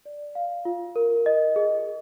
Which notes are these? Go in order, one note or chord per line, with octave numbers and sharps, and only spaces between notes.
D5
F5
F4
A#4
D#5
G#4